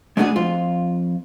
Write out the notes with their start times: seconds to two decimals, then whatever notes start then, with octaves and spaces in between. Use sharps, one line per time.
0.17 G#3 A3 B3 D4 F#4 G#4
0.36 F2 F4